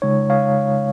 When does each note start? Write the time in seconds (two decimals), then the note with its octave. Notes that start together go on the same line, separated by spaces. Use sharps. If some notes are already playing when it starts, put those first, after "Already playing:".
0.02 C#3 G#3 D#4 C#5
0.30 C#5 F5